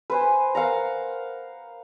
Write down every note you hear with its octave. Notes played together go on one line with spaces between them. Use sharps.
B4 C5 G#5
A#4 F5 F#5 A#5